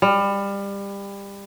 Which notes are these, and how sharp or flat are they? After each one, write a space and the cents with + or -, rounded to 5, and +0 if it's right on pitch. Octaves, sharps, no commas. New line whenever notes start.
G3 +25